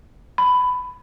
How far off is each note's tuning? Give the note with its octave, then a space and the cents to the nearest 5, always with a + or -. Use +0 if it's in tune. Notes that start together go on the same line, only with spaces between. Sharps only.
B5 +15